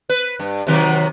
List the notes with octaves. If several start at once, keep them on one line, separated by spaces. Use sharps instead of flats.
B4
G2
C3 D#3 F#3